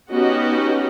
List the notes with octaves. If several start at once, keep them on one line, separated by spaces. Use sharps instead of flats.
B3 C#4 D#4 F#4 G4 D#5